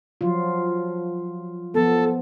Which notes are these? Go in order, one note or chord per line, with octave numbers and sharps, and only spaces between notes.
F3 F#3 F4
F3 B3 A4